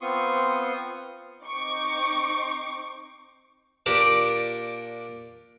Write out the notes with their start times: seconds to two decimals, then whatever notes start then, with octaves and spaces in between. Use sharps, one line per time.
0.01 B3 C4 F4 C6 C#6 D#6
1.45 C4 D#4 C#6 D6
3.86 A#2 D4 G4 A#4 D5 A5